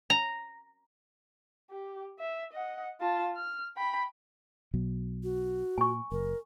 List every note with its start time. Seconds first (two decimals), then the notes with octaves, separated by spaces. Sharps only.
0.10 A#5
1.70 G4
2.19 E5
2.52 D#5 F#5
3.00 F4 A5
3.36 F6
3.76 G5 B5
4.74 B1 B2 F#3
5.23 F#4
5.78 A#2 G#5 C#6
6.12 F#1 A#4